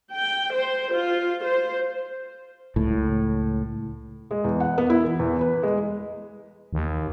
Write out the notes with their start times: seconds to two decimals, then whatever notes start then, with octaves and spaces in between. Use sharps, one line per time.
0.14 G5
0.53 C5
0.91 F4
1.44 C5
2.76 C#2 A2
4.31 G#3
4.44 E2
4.60 F#5
4.78 B3
4.90 E4
5.05 E3
5.19 E2
5.41 B4
5.63 G#3
6.73 D#2